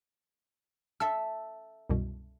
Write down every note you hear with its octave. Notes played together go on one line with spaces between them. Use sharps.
A4 E5 E6
C2 F#2 B2